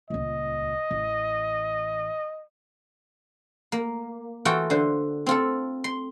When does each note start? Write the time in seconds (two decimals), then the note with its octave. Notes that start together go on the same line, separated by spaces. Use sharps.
0.10 D#1 C#2 D#5
0.91 A1
3.72 A#3
4.45 E3 F4 F#4 A4 G5
4.70 D3 C5
5.26 C4 F4 A4
5.84 C6